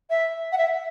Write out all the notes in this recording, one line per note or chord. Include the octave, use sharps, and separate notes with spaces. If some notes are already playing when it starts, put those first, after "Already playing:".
E5
F#5
E5